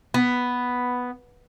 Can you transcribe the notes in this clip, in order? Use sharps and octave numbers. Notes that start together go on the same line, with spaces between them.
B3